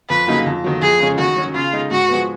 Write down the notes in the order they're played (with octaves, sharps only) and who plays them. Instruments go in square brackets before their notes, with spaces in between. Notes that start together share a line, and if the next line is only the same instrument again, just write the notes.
[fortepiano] F2 [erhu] B4
[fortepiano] C#3 F#3 A#3 D#4
F2
D#3 F#3
[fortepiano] F2 [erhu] G#4
[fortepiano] C#3 G#3 C#4
[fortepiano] D#3 [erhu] F#4
[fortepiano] F#3 C#4
[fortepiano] C#3 [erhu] F4
[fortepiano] G#3 D#4
[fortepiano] G#2 [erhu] F#4
[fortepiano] F3 G#3 B3